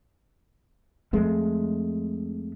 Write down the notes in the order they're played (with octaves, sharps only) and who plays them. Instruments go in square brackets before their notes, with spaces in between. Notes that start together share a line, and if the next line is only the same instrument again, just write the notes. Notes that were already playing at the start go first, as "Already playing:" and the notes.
[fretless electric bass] F2 G#3 A3